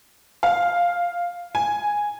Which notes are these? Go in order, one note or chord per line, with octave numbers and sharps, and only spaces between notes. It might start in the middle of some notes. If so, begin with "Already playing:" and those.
F5
G#5